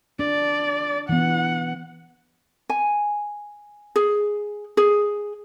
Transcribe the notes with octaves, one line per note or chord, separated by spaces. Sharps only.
D4 D5
E3 B3 F#5
G#5
G#4
G#4